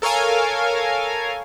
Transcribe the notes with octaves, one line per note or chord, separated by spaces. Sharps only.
A4 A#4 C#5 F5 G#5